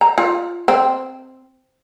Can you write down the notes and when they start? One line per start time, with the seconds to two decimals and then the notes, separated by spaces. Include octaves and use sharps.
0.01 A#5
0.18 F4
0.68 C4